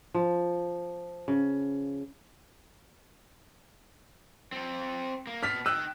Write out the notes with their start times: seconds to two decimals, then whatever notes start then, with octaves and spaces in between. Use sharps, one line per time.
0.14 F3
1.28 C#3
4.52 C4 A4
5.27 A#3
5.43 B2 A5 F6 B6
5.66 D#4 G5 E6 F#6